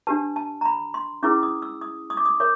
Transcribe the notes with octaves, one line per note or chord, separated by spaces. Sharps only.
D4 G4 B4 A5
A5
A#5
B5
C6
C#4 E4 G#4 B4 D6
D#6
E6
D#6
D#6
D6
D#6
A#4 C#5 D6